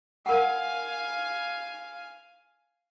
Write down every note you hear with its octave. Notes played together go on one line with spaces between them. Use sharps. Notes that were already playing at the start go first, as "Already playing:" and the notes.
A#4 F5 F#5 G#5